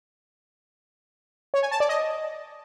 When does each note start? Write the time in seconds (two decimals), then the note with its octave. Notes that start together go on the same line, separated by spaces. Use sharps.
1.54 C#5
1.63 G#5
1.71 A5
1.80 D5
1.89 D#5